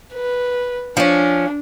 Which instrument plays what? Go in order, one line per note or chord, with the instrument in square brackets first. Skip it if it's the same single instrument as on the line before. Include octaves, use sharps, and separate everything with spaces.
[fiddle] B4
[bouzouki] F3 C#4 [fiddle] D4